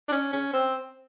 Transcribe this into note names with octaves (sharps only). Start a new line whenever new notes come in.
D4
C#4
C#4
C4